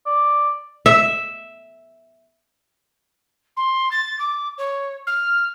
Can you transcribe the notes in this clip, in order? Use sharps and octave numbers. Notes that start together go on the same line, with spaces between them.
D5
E5
C6
A6
D6
C#5
F6